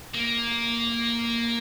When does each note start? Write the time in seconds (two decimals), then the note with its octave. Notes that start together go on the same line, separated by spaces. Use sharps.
0.15 A#3